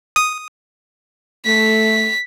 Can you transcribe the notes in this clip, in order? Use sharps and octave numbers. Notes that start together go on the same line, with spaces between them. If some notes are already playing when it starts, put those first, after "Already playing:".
D#6
A3 B6